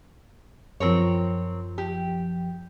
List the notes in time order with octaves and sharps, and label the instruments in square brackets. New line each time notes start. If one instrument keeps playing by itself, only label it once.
[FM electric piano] F#2 F3 [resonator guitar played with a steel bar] C4 A#4 C#5
[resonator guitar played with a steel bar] G4